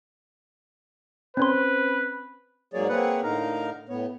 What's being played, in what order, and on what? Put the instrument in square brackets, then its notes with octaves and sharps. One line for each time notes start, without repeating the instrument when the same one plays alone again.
[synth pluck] C4 C#4 C5 [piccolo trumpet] B4
[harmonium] G#2 F#3 A#3 G#4 C#5 D5
A#3 C4 G#4 B4 C#5 F#5
A2 D3 D#4 A#4 F5 A#5
A2 B3 C#5